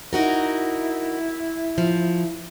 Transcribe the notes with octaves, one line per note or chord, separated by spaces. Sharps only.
D#4 E4 F#4 A#4
F3